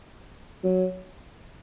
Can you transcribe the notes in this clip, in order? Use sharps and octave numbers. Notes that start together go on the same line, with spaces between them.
F#3